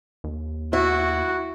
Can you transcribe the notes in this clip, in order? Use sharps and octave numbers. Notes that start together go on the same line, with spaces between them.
D#2
E4 F#4